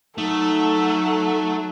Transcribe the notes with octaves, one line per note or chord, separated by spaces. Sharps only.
F#3 A3 D#4 A4